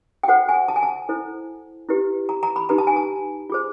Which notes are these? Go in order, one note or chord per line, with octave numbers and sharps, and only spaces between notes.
G5
F#4 A4 C5 F#5
G#5
A5
G#5
A5
E4 A4 C5
E4 G4 B4
A#5
A#5
B5
D#4 G4 B4 A#5
A5
G#5
A5
F4 G#4 C5